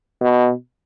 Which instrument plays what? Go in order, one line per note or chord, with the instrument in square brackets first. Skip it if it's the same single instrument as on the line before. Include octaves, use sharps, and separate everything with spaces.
[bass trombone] B2